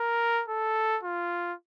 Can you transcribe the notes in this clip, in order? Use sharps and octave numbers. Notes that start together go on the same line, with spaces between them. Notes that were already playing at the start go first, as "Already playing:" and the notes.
Already playing: A#4
A4
F4